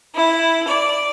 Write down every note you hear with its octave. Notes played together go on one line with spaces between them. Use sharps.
E4
D5